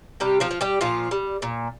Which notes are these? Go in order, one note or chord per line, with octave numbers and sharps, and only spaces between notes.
C3 G3 G4
F3 F4
F3
G3 G4
A#2 F3 F4
G3
A#2